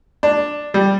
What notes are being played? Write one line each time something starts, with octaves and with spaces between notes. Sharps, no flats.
D4
G3